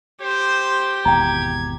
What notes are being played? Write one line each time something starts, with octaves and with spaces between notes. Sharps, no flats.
G4 C5
G#1 E2 B2 G5 A#5 G#6